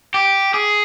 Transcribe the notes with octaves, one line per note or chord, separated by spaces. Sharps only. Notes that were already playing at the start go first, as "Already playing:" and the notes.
G4
G#4